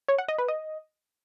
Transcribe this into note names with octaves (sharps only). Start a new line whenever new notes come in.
C#5
F#5
D#5
B4
D#5